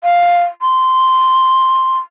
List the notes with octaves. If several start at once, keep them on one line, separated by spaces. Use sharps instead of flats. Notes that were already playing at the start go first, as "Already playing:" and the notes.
F5
C6